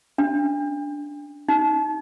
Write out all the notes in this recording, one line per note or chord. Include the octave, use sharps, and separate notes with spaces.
D4
D#4